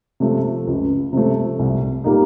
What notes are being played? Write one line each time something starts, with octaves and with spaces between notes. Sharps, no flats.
C3 F3 A3
C#2
C3 F3 A3
C2
A#2 G3 A#3 D#4